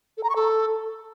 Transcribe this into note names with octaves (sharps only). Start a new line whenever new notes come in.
A4
A#5
C#6
A4